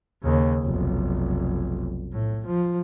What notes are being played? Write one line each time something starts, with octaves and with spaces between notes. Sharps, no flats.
D#2 C#3
F1 B1
A2
F3